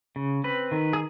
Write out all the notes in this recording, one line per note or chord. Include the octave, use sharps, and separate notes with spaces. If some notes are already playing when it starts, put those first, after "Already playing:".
C#3
C4 B4
D#3
G#4